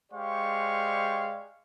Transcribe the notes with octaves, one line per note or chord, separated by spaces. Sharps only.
G#3 G4 C5 D5 F5 C#6